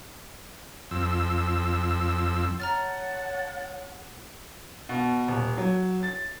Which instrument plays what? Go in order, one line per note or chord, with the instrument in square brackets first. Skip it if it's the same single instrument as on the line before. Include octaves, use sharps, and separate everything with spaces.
[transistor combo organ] F2 E6
[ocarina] C#5 [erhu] F#5 [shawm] A5 [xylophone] A#5 F6 A6
[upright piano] B2
D#1
F#3
A6